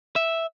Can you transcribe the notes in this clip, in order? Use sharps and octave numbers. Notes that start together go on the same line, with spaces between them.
E5